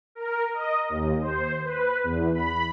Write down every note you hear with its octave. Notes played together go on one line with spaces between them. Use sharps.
A#4
D#5
D#2
C5
B4
E2
B5